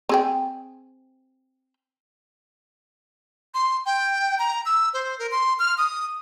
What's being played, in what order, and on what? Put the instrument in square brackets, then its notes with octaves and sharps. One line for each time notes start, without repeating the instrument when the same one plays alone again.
[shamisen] C4 G#4 G5
[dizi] C6
G5
A#5
E6
C5
A#4
C6
F6
D#6